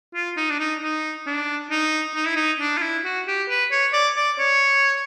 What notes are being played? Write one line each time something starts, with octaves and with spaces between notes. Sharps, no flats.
F4
D#4
D4
D#4
D#4
D4
D#4
D#4
E4
D#4
D4
F4
E4
F#4
G4
B4
C#5
D5
D5
C#5